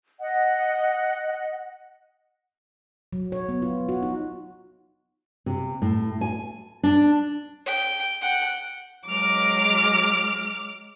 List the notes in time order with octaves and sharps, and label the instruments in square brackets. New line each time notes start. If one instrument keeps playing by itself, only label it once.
[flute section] D#5 F#5
[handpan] F#3
C#5
B3
F4
F#4
D#4
[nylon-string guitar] C3
A2
G#5
D4
[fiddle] G5
F#5 G5
[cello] F#3 G#3 [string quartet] D6 F6